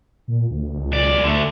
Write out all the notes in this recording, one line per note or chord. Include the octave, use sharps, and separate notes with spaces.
A#2
D2
C#2
B1 D5
D2 D3 A3